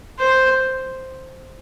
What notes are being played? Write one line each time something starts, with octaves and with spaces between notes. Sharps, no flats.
C5